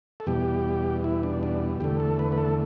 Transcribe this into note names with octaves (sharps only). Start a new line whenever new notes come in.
A4
E2 B2 G3 G4
E4
D4
D4
E2 D3 A3 G4
A4
B4
B4
A4